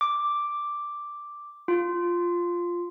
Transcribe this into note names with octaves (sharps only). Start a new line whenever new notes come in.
D6
F4